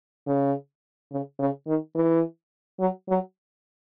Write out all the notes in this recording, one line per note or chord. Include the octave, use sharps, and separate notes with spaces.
C#3
C#3
C#3
D#3
E3
F#3
F#3